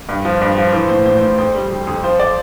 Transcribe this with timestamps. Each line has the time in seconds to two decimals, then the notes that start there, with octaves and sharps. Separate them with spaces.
0.09 G2
0.25 F3
0.41 G2
0.58 F3
0.73 E3 C5
0.89 A2 C5
1.06 A2 C5
1.17 C5
1.22 A2
1.27 C5
1.38 F2 C5
1.55 G3
1.71 F2
1.87 F2
2.03 F3 C5
2.20 D5